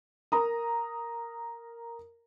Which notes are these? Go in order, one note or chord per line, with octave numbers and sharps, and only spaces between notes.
A#4 A#5 D#6